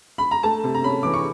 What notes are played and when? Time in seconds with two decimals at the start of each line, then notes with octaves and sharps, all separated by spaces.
0.18 B5
0.31 A#5
0.43 A3 A5
0.64 C3
0.74 A#5
0.84 C#4 B5
1.03 E3 D6
1.14 C#6